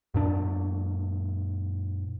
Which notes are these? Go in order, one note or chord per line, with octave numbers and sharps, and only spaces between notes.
F#2 A#2 D4